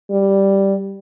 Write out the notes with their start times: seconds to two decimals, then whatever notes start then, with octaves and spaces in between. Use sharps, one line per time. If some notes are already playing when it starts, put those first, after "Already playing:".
0.11 G3